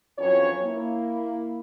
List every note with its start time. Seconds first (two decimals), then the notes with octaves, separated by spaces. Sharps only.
0.18 F2 E3 F#3 C#4 C#5
0.63 A#3 E4